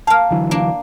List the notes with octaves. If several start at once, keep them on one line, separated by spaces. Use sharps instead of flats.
A#3 F5 A5 F6
D3 E3 F#3
A#3 D4